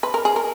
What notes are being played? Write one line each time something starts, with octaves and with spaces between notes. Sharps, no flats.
B4
A#4
G#4
A#4